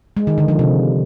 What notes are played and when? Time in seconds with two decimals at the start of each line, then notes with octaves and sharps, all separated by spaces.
0.17 G#3
0.27 D#3
0.38 D3
0.48 F3
0.59 C3